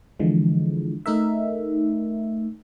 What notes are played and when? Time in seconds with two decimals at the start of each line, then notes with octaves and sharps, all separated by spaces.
0.20 D3 E3 F3 G#3
1.06 A3 D#4 A#4 E5